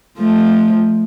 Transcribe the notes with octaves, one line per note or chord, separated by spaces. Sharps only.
F3 A3